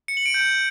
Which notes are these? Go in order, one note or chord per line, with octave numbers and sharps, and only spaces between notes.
C#7
F#7
D7
G6